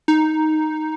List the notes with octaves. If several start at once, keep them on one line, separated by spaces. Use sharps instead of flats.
D#4